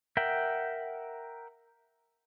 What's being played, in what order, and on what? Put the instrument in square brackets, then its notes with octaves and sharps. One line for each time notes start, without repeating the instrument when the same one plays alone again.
[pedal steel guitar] A#4 E5 F#5 G5